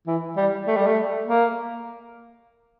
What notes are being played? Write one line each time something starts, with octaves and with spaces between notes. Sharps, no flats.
E3
G3
A3
G3
A3
A#3